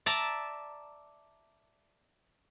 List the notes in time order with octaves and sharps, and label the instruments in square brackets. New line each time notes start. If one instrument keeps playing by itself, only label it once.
[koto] D5 E5 A5 A#5